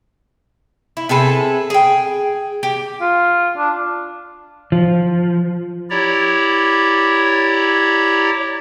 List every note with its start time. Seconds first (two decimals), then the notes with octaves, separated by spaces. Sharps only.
0.97 E4
1.09 C3 G#4 A4 B4
1.70 G#4 G5
2.63 G4
3.01 F4
3.57 D4
4.72 F3
5.90 E4 G4 C#5 D5 A#5